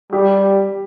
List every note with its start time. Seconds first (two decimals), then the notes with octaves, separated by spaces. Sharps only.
0.13 G3 G4